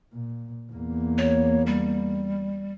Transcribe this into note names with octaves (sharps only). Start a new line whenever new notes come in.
A#2
E2 A#3
C#5
G3